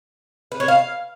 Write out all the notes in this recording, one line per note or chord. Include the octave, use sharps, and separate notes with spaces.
B4
C#5
F5